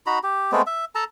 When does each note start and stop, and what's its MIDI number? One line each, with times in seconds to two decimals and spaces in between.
0.06 0.19 63
0.06 0.19 66
0.06 0.19 82
0.06 0.19 83
0.23 0.51 67
0.52 0.62 56
0.52 0.62 57
0.52 0.62 59
0.52 0.62 60
0.67 0.85 76
0.95 1.04 69
0.95 1.04 81
0.95 1.04 82